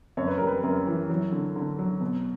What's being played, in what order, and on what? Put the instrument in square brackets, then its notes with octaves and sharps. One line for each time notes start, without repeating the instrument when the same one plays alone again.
[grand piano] F#2 C#5
B4
G3 A#4
B4
F#2 A#4
E3
F#3
D3
D3
F#3
B2